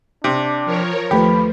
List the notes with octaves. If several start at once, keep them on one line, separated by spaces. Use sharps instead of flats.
C3 D4
F3 A#4 C#5
D#2 F3 A3 G4 B4 B5